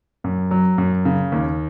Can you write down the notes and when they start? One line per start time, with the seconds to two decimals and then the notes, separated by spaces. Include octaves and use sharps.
0.24 F#2
0.51 F#3
0.78 F#2
1.05 C#3
1.32 D#2